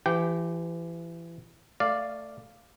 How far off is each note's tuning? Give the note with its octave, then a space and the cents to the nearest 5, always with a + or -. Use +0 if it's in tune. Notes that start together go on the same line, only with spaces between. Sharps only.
E3 +30 G4 +0 G5 -25
A3 +20 D5 +0 F5 -5